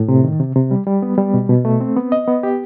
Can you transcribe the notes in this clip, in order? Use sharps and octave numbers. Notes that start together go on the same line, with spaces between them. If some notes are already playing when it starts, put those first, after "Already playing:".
Already playing: A2
C3
D#3
C3
C3
G3
G3
B3
G3
B2
B2
A3
C4
B3
D#5
B3
G4